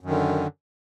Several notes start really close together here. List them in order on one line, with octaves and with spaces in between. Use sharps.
F#2 D#3 D3